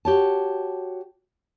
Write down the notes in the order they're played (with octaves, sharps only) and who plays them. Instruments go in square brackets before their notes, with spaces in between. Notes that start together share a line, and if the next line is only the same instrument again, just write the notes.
[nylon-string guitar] F#4 G4 C#5 A5